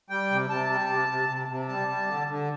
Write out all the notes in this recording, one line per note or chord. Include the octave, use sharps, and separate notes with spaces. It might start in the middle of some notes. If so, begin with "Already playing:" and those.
G3 G5
C3
C3 A5
G3
C3
C3
C3
C3
G3 A5
G3
D3
D3